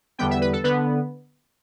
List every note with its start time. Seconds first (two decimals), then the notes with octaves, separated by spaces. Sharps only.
0.18 E2 D3 G3 B3 G5
0.31 E5
0.41 B4
0.53 A4
0.64 D3 B3 B4